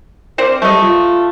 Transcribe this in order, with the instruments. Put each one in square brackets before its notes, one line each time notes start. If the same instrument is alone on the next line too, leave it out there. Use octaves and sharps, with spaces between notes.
[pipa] C4 C5 D5 [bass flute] A#4
[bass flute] G3 [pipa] A3 D#5
[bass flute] F4